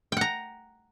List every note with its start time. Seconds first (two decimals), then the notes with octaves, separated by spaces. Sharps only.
0.12 G5
0.17 F#5
0.21 A#5